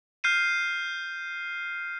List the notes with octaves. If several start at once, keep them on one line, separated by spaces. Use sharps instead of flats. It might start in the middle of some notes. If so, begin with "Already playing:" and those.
F6 G6 C7 D#7